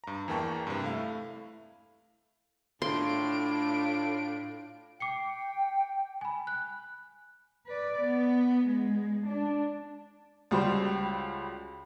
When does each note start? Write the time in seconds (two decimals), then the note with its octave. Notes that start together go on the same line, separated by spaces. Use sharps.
0.04 G2 A#5
0.28 E2 E3 A#3 G5 A5 C#6
0.67 G2 C3
0.84 A3 E4 F5
2.82 A2 D4 F4 C6 D7
5.00 G5 D6 C7 C#7
6.21 G#5 B5
6.47 F#6
7.67 B4 D5
8.02 B3
8.66 G#3
9.27 D4
10.51 C#2 G3 F#4 C5